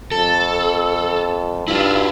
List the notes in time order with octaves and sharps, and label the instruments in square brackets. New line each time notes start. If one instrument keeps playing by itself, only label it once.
[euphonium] F2 [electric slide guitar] A4
[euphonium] G2 [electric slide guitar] E4 F4